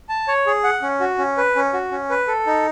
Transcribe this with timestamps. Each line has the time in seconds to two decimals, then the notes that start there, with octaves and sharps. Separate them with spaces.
0.09 A5
0.28 C#5
0.46 G#4
0.64 F#5
0.82 C#4
1.00 F#4
1.18 C#4
1.38 B4
1.56 C#4
1.73 F#4
1.92 C#4
2.10 B4
2.27 A4
2.47 D#4